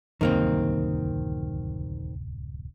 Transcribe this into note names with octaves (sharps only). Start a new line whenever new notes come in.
D1 C2 F#2 D#3 A#3 C4